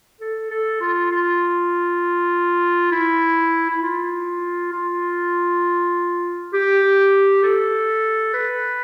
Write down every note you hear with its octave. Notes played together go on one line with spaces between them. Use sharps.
A4
A4
F4
F4
E4
E4
F4
F4
G4
A4
B4